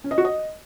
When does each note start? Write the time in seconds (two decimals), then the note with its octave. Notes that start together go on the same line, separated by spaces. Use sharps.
0.04 C#4
0.11 D#5
0.18 F#4
0.25 D#5